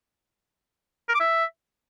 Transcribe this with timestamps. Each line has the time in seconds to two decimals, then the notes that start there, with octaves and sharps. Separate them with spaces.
1.09 A#4
1.15 D6
1.20 E5